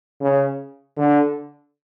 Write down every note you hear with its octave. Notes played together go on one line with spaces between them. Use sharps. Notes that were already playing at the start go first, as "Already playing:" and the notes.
C#3
D3